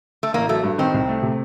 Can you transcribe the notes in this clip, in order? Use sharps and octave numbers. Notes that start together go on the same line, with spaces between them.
A3
A1 A#3
F#3 A3
G2
D#3 C4
C2
A3
C3